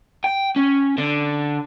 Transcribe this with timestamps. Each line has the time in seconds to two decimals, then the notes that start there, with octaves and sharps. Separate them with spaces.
0.24 G5
0.56 C#4
0.98 D3